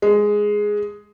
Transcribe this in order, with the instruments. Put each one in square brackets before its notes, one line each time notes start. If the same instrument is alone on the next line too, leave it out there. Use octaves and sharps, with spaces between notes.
[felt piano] G#3